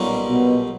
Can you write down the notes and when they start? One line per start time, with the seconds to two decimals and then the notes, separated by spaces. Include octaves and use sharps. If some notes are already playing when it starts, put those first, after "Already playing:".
Already playing: B1 A#2 G3 A#3 C#4
0.27 B2